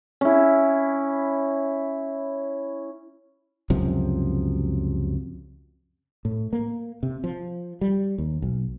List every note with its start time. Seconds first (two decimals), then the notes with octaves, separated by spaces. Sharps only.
0.21 C#4 E4
3.70 C#2 F#2 C3 F3
6.25 A2
6.53 A#3
7.03 C3
7.24 F3
7.81 G3
8.18 D#2
8.42 B1